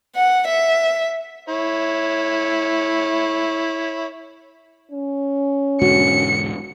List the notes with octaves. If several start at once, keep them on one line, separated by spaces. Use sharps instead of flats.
F#5
E5
E4 C#5
C#4
E1 G#2 D3 F#4 C#7